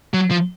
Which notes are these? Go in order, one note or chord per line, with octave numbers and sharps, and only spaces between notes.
F#3
F3